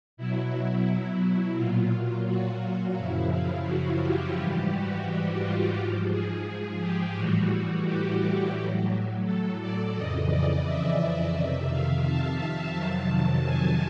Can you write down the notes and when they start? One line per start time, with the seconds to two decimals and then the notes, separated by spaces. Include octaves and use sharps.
0.17 B2 F#3 E4
1.57 A#2 F#3 F4
2.26 F#4
2.62 F#4
2.96 F#2 C#3 F3 E4
3.32 F4
3.66 F#4
4.02 G4
4.36 G#2 E3 G3 G4
4.71 F#4
5.41 F4
5.76 G#2 F3
6.10 G#4
6.46 G#4
6.81 G4
7.16 A2 E3 G3 F#4
7.85 G4
8.55 A2 F#3
9.24 A4
9.60 D5
9.95 F2 C#3 E3 D#5
10.29 D5
10.65 E5
10.99 D#5
11.34 F2 C3 D#3 E5
11.69 F5
12.05 A5
12.39 A5
12.74 F2 C3 D#3 F#3
13.44 G#5